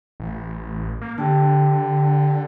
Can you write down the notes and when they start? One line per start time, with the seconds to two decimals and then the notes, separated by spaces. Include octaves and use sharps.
0.20 A1
1.01 A#3
1.18 D3 G4 G5 A5